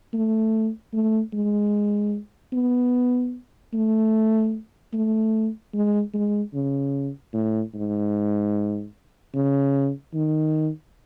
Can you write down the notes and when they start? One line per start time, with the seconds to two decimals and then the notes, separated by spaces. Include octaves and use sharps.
0.13 A3
0.93 A3
1.33 G#3
2.53 B3
3.74 A3
4.93 A3
5.74 G#3
6.14 G#3
6.54 C#3
7.34 A2
7.74 G#2
9.34 C#3
10.14 D#3